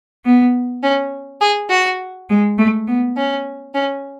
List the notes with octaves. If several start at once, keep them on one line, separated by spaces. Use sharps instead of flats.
B3
C#4
G#4
F#4
G#3
A3
B3
C#4
C#4